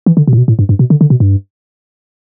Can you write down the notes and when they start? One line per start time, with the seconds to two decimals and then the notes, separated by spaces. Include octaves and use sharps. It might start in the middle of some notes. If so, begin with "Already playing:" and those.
0.06 E3
0.17 D3
0.28 B2
0.33 A2
0.38 B2
0.48 A2
0.59 G2
0.69 G2
0.79 B2
0.90 D3
1.01 D3
1.10 B2
1.20 G2